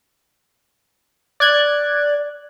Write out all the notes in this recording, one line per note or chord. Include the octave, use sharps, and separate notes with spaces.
D5 F#6 G#6